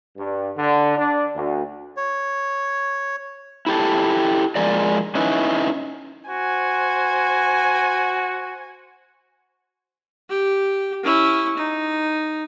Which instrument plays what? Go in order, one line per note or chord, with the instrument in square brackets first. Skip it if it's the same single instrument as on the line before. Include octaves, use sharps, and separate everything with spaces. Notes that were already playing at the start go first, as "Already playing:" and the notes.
[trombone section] G2
D3
D4
D2
[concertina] C#5
[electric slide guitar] E4 G4 A4
F3 G#3 A#4 D5
C#4 D#4 E4 B4
[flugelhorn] F#4 [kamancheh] C5 G#5
[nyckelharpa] G4
C#4 E4
D#4